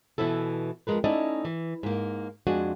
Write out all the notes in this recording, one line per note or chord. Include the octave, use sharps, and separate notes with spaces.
B2 E3 B3 E4 A4
F2 D#3 G#3 A#4 B4
A3 C#4 D#4 E4 D5 D#5
E3
G#2 A#3
F2 G#3 D4 F#4 G#5